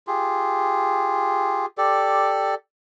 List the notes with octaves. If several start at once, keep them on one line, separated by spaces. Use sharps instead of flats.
F4 G4 G#4
G4 A4 D5